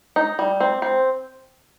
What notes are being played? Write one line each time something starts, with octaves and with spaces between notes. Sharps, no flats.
D#4
G3
C4
C4